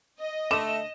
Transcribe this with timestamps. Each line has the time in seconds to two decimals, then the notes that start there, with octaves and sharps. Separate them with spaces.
0.19 D#5
0.51 D3 A3 E7